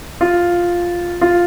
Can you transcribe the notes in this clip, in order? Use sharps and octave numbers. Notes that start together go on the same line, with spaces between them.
F4
F4